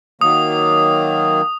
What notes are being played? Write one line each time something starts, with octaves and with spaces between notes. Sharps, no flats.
D#3 F#3 A#3 D#6